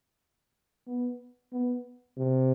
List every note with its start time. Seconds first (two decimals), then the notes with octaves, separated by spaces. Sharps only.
0.87 B3
1.53 B3
2.17 C3